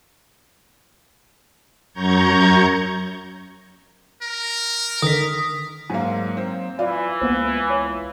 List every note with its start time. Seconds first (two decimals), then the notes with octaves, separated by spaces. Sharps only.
1.93 F#2 A#5 C#6 G6 G#6
4.23 A#4
5.02 D3 D#3 D#6 B6
5.90 G#2 F#3 A#3 G#5
6.37 C4
6.79 E3 F4 D5
7.21 C#2 A#3 B3 C5
7.70 C#5